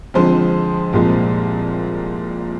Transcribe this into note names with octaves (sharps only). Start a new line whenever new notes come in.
F2 D3 F3 G#3 C5
C2 A#2 F3 G#3